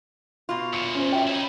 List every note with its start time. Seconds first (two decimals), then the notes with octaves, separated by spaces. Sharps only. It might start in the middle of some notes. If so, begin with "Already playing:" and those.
0.49 B2 F4
0.73 E2 A#2 C#7
0.95 C#4 C5
1.12 E5 G5
1.27 D#4 E4